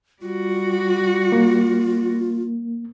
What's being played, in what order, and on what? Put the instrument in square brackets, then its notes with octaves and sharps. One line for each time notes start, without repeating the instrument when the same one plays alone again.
[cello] G3 F#4 [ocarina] F4
[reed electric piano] A#3